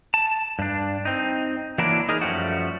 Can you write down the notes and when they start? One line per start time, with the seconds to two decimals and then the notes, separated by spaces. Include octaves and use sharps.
0.14 A5
0.59 G2 D4
1.05 C4 D#4
1.78 E3 F#3 A#3 D4 E4 A#4
2.09 D#4 G#4 A#4
2.22 F#2 F3 G3 A3 F#4